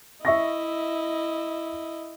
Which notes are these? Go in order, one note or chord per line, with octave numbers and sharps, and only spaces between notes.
E4 D#5 E5 C#6 A#6